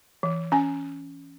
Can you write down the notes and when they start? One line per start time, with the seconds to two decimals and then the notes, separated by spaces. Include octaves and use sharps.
0.23 E3
0.52 C#4 G#5